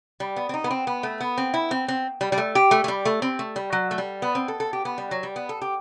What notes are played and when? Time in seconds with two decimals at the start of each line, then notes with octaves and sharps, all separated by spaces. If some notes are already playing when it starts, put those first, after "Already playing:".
0.20 G3
0.36 B3
0.49 C4
0.54 D#4
0.64 B3
0.71 C4
0.87 B3
1.03 A3
1.21 B3
1.38 C4
1.54 E4
1.71 C4
1.88 C4
2.21 G3
2.32 G3
2.38 A3
2.55 G4
2.71 A3
2.84 A3
2.88 G3
3.05 A3
3.22 C4
3.39 A3
3.56 G3
3.72 F#3
3.91 A3
3.98 G3
4.22 B3
4.35 C4
4.48 A4
4.60 A4
4.73 G4
4.85 B3
4.98 G3
5.11 F#3
5.23 G3
5.36 B3
5.49 A4
5.62 G4